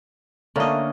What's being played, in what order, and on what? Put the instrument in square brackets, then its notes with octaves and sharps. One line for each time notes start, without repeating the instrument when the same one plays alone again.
[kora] D3 D#5 [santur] A3 A#3 C#4